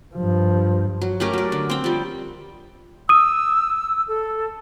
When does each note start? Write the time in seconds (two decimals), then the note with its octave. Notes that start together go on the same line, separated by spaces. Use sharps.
0.16 G2 F3
1.01 F#3
1.20 A3 C#4 G4 A#4
1.33 F#3 D5
1.52 D3
1.70 C4 F5 G5
1.84 F3 G3
3.09 D#6 E6 D#7
4.08 A4